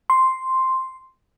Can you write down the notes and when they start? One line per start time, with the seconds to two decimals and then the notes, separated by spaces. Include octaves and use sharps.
0.10 C6